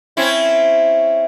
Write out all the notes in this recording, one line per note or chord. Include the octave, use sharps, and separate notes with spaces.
C4 C#4 E4